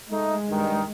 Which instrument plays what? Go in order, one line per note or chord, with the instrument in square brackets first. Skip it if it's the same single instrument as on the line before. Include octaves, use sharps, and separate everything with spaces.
[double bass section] G#3 [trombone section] A3 D#4
[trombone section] G2 D#3